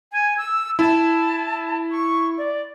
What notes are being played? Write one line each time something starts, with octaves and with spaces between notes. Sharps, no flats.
G#5
E6
E4 A5
C#6
D5